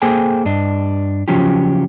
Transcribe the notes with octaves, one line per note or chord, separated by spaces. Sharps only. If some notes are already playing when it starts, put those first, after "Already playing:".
A#3 G#4 A4 C5 G5 G#5
G2 D4 D#5
C#3 F3 F#3 C#4 F4 G4